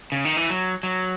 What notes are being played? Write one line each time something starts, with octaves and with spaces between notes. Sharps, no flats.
C#3
D#3
E3
F#3
F#3